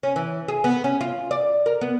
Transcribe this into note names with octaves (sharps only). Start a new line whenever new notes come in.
C#4
E3
G#4
B3
C#4
F4
D5
A#4
B3